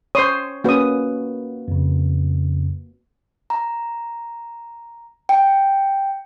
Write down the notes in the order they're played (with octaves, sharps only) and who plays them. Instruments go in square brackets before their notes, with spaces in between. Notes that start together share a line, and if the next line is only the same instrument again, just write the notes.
[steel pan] C5 C6 D#6 [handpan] C#5
[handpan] A#3 F#4 B4 [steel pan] C#4 D#6
[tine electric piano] F2 C#3
[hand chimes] A#5
G5